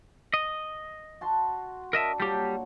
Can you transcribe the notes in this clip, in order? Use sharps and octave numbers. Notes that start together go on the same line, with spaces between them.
D#5
F#4 A5 C6
D4 A#4 D#5 E5
A#2 F#3 G3 G4 A4